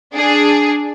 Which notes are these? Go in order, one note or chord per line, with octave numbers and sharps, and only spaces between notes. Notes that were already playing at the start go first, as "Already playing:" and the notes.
D4 G#4